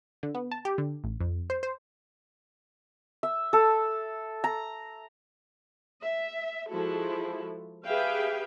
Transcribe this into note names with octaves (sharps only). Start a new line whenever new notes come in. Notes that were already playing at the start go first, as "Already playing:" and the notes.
D3
B3
A5
G4
D3
A1
F2
C5
C5
E5
A4
A#5
E5
F3 G#3 E4 F#4 A4
G4 G#4 B4 E5 F5 G5